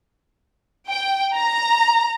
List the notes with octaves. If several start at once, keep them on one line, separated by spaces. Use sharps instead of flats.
G5
A#5